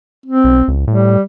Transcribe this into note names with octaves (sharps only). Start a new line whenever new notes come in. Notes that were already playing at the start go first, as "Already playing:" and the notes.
C4
B1
C#2
A2 G3